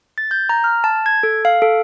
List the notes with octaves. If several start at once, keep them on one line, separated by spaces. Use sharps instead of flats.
A6
G6
A#5
F6
A5
G#6
A4
F5
A4